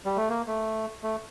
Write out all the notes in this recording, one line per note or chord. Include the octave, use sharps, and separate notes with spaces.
G3
A3
A#3
A3
A3